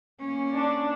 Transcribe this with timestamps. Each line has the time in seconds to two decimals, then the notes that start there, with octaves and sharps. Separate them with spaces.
0.20 A#3 C#4
0.52 D4